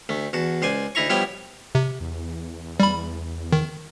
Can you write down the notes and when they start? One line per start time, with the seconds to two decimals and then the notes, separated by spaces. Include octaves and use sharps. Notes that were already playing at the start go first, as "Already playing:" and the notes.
0.09 D2 A3
0.33 E2 F#4 A5
0.62 C#2 C5 D5 G#5
0.95 D2 D#4 E4 A#5 C#6
1.09 F3 G3 B3 E4 C#5 G5
1.75 C3
2.00 E2
2.80 G3 B5
3.52 D#3